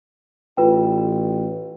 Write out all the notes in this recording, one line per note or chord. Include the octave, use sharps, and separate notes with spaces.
A1 F4 B4 G5